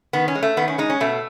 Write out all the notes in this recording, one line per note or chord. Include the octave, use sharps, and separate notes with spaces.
D#3 B3
C#4
G#3
A3
D#3 B3
C#4
G#3 D#4
C#4
B2 A3